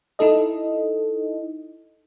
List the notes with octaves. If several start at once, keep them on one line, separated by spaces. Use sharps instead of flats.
D#4 E4 A4 D#5